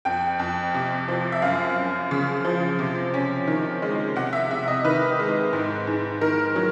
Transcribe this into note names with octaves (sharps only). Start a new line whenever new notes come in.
F2 G5
F2
C3
F3
E5
F#2 F5
F#2
C#3
F3
C3
C#4
D#3
G#3
C3 F#5
E5
C3 E5
D#5
D#3 B4
G#3
G#2
G#2
D#3 A#4
F#3